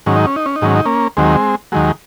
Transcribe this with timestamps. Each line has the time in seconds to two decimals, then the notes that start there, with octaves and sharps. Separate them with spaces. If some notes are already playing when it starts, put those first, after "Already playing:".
0.06 G#2 D#3 F#3 C#4
0.16 D#4
0.26 C#4
0.36 D#4
0.46 C#4
0.56 D#4
0.62 G#2 D#3 F#3 C#4
0.76 D#4
0.85 A#3 C#4
1.17 D#2 D#3 F#3 G#3 C4
1.72 D#2 D#3 F#3 G#3